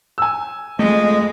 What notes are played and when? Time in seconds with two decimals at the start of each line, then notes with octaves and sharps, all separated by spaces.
0.18 G#5 E6
0.79 F2 G#3 A3 D#5